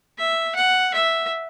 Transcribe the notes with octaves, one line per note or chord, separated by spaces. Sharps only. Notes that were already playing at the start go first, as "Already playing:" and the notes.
E5
F#5
E5